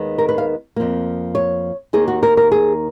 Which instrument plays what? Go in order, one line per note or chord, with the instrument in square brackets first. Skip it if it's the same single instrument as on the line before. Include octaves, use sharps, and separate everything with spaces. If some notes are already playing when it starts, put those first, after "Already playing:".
Already playing: [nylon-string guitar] D#2 D#3 G#3 B3
A#4
B4
F5
F2 F3 A#3
C#5
D#2 D#3 A#3 G#4
F#4
A#4
A#4
G#4